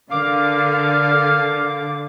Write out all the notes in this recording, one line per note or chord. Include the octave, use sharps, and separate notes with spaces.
D3 A#4 F5 D6